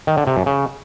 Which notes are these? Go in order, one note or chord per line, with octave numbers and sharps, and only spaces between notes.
D#3
D3
C3
F#2
C#3